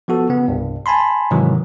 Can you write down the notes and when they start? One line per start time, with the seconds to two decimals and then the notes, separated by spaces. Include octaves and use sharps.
0.08 F3 B3 F#4 A4
0.29 C#3 B3
0.48 C2 G2
0.86 G#5 A5 B5 C6
1.31 G#2 C3 D#3 E3 F#3